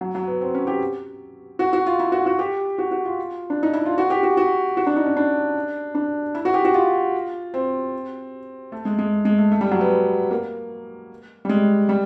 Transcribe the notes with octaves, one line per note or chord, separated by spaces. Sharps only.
F#3
F#3
B3
C4
C#4
G4
F#4
F#4
F4
E4
F#4
F#4
G4
F#4
F#4
F4
D4
D#4
E4
F4
F#4
G4
F#4
F#4
F#4
D4
D#4
C#4
D4
D4
E4
F#4
G4
F#4
F4
C4
A3
G#3
G#3
G#3
A3
A3
G3
F#3
B3
B3
A#3
G3
G#3
G3